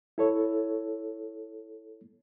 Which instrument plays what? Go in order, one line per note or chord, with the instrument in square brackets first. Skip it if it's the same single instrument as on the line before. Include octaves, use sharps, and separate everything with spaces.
[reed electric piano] E4 A4 C#5